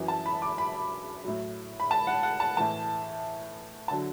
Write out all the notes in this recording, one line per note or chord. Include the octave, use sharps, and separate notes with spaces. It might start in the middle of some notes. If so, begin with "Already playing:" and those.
Already playing: F#2 E3
A5
B5
D6
B5
A2 F#3
B5
A5
F#5
F#5
A5
A2 E3 A5
D3 F#3 A5